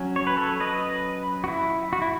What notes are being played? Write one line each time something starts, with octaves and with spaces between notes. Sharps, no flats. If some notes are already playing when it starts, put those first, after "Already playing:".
Already playing: F#3 C#4
C#5
B4
A4 C#5
B4 D#5
F#4
E4
F#4
E4